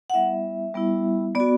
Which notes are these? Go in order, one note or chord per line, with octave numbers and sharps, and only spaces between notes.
F#5
G3 B3 E4 E5
G3 B3 E4
B3 F#4 D5